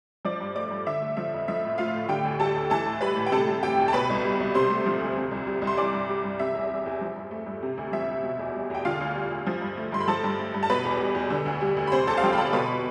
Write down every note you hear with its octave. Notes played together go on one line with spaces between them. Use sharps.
F3 D5 D6
G2
A3 D5 D6
G2
D3 E5
A3
F3 E5
F2
F3 E5
A2
A3 F4 F5
A2
D3 G4 G5
D2
G3 A4 A5
D2
E3 A4 A5
A2
G3 B4 B5
A2
G5
C3 A4 A5
G3
E3 G4 G5
D2
A5
B2 B4 B5
C2
G3
C2
C3 C5 C6
A3
F3
D2
C3
C2
G3
C2
C6
E3 D5 D6
G2
G3
G2
C3 E5
E2
G3
E2
F3
G2
A3
G2
C3
D2
F3 E5
D2
B2
E2
G3
E2 G5
D3 F4 F5
D2
G3
D2
F3
G2
A3
G2 C6
B5
F3 A4 A5
G2
A3
G2
A5
B2 B4 B5
E2
G3
E2
D3
D2
G3
D2
B5
C3 C5 C6
E2 A4 A5
F5
F3 G4 G5
B5
E2 A4 A5
B2 B4 B5